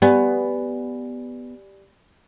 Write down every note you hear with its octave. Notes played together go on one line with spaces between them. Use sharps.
B3 G4 D5 G#5